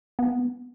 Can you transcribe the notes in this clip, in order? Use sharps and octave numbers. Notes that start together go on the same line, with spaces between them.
B3